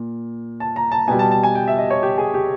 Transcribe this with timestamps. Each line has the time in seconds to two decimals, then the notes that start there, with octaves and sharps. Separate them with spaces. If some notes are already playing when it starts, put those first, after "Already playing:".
Already playing: A#2
0.60 A5
0.76 A#5
0.92 A5
1.08 B2 G3 G#5
1.19 A5
1.31 A5
1.43 G#5
1.55 G5
1.68 E5
1.78 D#5
1.90 C#5
2.03 G4
2.18 G#4
2.34 G4